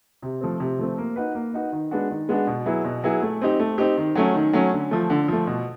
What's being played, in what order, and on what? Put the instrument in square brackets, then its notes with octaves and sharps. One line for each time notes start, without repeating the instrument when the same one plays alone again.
[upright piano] C3
F3 A3 C4
C3
F3 A3 C4
A#3
D#4 F#4 B4
A#3
D#4 F#4 B4
D#3
G#3 B3 D4 F#4
D#3
G#3 B3 D4 F#4
B2
F#3 B3 E4 G#4
B2
F#3 B3 E4 G#4
A3
C4 D#4 G4
A3
C4 D#4 G4
D#3
F#3 A3 C#4
D#3
F#3 A3 C#4
D3
F3 A3
D3
F3 A3
B2